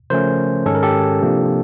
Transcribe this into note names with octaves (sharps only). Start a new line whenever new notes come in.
C#3 F3 A3 C#4 A#4 C5
G#2 D#3 G#3 C#4 A4
A#4
G4 A4
C3 F3 A#3 D4